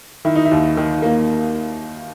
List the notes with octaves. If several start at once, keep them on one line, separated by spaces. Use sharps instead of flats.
D#3 E4
D#4
E4
D#2
D#3
A#3